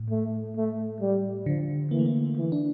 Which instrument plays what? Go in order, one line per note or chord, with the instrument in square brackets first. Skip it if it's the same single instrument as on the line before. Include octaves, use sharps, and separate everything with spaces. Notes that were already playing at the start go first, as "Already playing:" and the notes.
Already playing: [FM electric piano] A2
[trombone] A3
A3
G3
[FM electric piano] D3 [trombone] F3
[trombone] E3 [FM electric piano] A#3
[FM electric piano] A3
A#3
[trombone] E3
[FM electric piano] D4